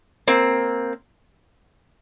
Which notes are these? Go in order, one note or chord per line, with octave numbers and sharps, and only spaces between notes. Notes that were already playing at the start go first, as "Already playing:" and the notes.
A#3 C4